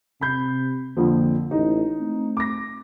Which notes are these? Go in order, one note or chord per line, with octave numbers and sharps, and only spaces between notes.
C3 B5 G6 C7
F2 D3 F3 A#3
A1 D#4
A3 C4
D6 A#6